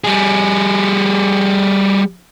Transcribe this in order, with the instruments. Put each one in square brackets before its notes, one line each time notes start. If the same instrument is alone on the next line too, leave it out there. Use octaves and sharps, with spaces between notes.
[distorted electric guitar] G3 G#4